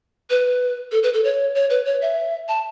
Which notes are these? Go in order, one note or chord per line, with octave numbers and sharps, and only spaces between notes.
B4
A4
B4
A4
C#5
C#5
B4
C#5
E5
A5